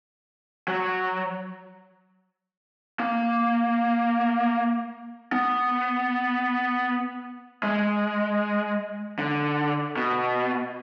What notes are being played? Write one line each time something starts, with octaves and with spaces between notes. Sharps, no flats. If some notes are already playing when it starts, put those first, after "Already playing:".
F#3
A#3
B3
G#3
D3
B2